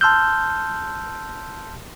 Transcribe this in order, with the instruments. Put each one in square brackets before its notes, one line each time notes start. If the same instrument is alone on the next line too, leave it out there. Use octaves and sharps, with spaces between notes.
[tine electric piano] A5 C6 E6 F6 G6